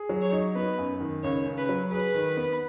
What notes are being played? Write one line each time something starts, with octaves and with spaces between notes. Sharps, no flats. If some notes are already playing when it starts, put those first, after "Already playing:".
Already playing: G#4
F#3
C#5
D#4
B3 B4
F#2
D#3
C#2 C#5
C#3
B4
F#3
G#4 B4
D#3
B3